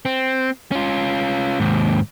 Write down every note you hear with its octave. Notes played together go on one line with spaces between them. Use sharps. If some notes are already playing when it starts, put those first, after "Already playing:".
C4
C#4 F4
D#2 G#2